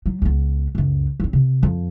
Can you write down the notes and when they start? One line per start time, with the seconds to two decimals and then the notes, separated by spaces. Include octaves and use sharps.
0.06 F#3
0.22 C#2 B3
0.75 C#2 F#2
1.20 F#3 C4
1.33 C3
1.63 F2 F3